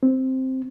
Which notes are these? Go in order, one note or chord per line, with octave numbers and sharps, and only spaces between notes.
C4